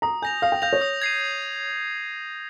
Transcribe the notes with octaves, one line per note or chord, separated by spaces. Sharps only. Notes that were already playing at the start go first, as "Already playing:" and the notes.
A#5 D#6
G#5 G6 A#6 F7
F5 D#6
G5
F5 G6 A#6 F7
C#5
D#6
G#6 C7 D#7